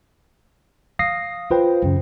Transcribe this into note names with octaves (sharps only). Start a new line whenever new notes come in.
F5 D#6 A#6 C7
F4 B4 C5 G5
F#2 C#3